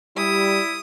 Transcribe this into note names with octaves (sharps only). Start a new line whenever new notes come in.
G3 E4 D#6